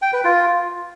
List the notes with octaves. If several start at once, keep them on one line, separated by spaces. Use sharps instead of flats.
G5
B4
F4